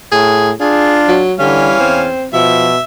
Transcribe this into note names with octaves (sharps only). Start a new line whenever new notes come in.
A2 G#4
D4 F4 G#4
F#3
D3 E3 G3 C#4 F5
E2 C4
B2 F3 E5